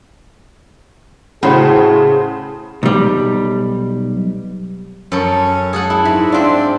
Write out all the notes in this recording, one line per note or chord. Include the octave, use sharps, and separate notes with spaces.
A2 C#3 F#4 G#4 C5
B1 G3
F#2 C#4 A4
G#4 A4 F#5
E4
G#2 E4
C4 D4 F4